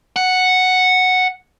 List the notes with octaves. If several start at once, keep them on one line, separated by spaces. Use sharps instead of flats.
F#5